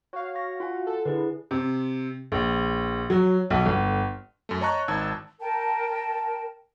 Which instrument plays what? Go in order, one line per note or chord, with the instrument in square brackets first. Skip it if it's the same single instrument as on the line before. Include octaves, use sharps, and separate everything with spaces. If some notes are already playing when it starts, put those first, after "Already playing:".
[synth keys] F#4 F5 [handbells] C#5
[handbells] C#6 A#6
F4 F#5 G#5
[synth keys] A4
[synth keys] D3 [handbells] E4 G#4 B4
[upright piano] C3
A#1
F#3
B1
G1
[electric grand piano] F#2 A3
C#5 D#5 A5 A#5 C#6 F#6
G#1 D#4 A5 E6 G#6
[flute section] A#4 G5 A5